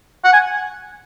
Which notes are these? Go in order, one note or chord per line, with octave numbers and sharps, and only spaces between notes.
F#5
G#5